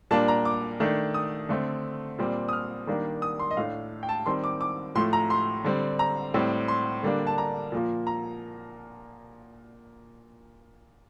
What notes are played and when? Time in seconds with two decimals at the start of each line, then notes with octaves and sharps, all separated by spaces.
0.11 A#2 G3 A#3 D4 A5
0.28 A#5
0.45 D6
0.80 D#3 A3 D4
1.14 D#6
1.49 D3 A3 C4
2.19 A#2 G3 C4
2.49 D#6
2.53 F6
2.87 D#3 G3 A#3 D4
3.22 D#6
3.39 C6
3.51 D#5
3.57 A2 A3 D4 F5
4.03 G5
4.09 A5
4.26 D#3 G3 C4 C6
4.44 D6
4.61 D6
4.95 A2 F3 A3 C6
5.13 A#5
5.30 C6
5.64 D3 G3 C4
5.99 A#5
6.34 A2 G3 C4
6.68 C6
7.03 D3 G3 A#3 D4
7.27 A5
7.38 A#5
7.72 A#2 F3 A#3
8.07 A#5